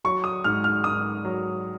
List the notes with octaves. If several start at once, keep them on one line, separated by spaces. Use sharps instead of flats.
F#3 C#6
D#6
G#2 F6
F6
G#2 D#6
F#3